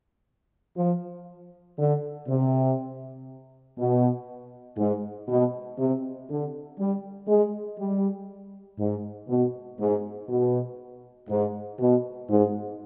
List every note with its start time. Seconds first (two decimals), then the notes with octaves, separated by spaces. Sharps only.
0.77 F3
1.78 D3
2.28 C3
3.78 B2
4.77 G#2
5.28 B2
5.78 C3
6.29 D3
6.79 G3
7.28 G#3
7.79 G3
8.79 G#2
9.28 B2
9.80 G#2
10.29 B2
11.29 G#2
11.79 B2
12.29 G#2